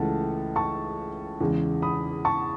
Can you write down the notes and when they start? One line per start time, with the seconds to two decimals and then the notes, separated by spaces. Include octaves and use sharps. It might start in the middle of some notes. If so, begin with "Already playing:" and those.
Already playing: C#2 C#3 E3 A3 F#5 A5
0.56 A5 C#6
1.41 E2 C#3 G#3
1.82 B5 D#6
2.25 A5 C#6